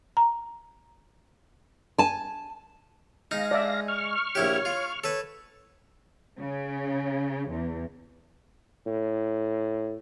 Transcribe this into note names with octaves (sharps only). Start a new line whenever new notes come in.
A#5
G#5 A5
G#3 D#4 F5 A#6
D5 E5
C#6 F6
A#1 E4 G4 C#5
F4
A4 B4 C#5
C#3
E2
A2